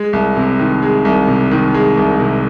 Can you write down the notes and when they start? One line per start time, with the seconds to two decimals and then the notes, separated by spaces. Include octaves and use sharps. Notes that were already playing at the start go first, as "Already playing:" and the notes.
Already playing: G#3
0.13 C2
0.37 C3
0.59 D#3
0.83 G#3
1.05 C2
1.28 C3
1.51 D#3
1.74 G#3
1.97 C2
2.20 C3